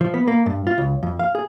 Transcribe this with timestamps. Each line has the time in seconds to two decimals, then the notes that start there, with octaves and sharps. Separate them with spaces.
0.01 F3
0.14 B3
0.28 A#3
0.46 G2
0.67 F4
0.78 C#2
1.03 F2
1.19 F5
1.35 G#4